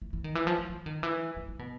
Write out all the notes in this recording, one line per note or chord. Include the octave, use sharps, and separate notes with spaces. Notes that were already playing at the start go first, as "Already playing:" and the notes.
E3
E3
D#3
E3
F3
F3
E3
D#3
E3
E3
E3
B2